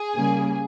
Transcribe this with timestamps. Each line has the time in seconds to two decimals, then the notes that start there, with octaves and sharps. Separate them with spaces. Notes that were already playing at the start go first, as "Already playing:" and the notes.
Already playing: G#4
0.15 C#3 G3 A#3